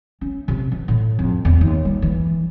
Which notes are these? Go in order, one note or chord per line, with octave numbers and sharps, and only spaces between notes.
C#4
C3
E3
A2
F2
E2
D#2
G3
E3